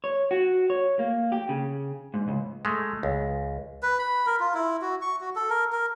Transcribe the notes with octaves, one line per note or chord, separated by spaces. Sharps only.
C#5
F#4
C#5
A#3
G4
C#3
G#2
C#2
G#3 A3
C#2
B4
B5
A#4
F4
E4
F#4
C#6
F#4
A4
A#4
A#4